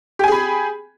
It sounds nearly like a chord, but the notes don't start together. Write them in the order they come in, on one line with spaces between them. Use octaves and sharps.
G4 G#5 G#4 B5